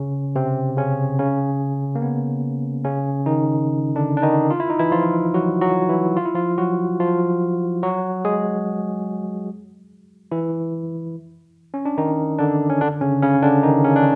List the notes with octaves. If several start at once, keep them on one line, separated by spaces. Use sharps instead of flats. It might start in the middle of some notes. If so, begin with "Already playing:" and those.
Already playing: C#3 C#4
C3 C4
C#3 C#4
C#3 C#4
A#3
B3
C#3 C#4
D#3 D#4
D3 D4
D4
D#3 D#4
F4
E4
D#4
E3 E4
F3 F4
F#3 F#4
F#3 F#4
E3 E4
F4
E4
F3 F4
F#3 F#4
F3 F4
F#3 F#4
G#3 G#4
E3 E4
C#4
D4
D#3 D#4
D3 D4
C#4
D3 D4
C#3 C#4
C#3 C#4
D3 D4
D#3 D#4
C#3 C#4
D4